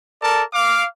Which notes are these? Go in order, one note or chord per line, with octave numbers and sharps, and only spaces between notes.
A4 A#4 D5 A5
F5 D6